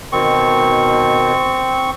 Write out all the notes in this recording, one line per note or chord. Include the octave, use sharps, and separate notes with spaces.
B2 D#3 C4 C#6